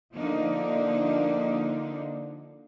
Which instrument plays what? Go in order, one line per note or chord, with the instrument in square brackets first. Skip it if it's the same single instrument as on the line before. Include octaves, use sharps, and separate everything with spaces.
[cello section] D3 F3 A#3 D4 D#4